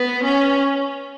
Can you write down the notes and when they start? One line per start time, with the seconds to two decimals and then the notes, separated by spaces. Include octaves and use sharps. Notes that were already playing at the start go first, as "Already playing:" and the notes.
Already playing: B3
0.24 C#4